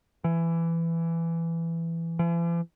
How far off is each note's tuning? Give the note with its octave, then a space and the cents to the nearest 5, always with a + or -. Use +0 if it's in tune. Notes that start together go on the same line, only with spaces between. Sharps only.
E3 +15
E3 +45